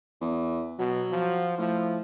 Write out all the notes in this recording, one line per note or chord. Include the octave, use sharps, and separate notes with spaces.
E2
B2 F#3
F3
A2 F3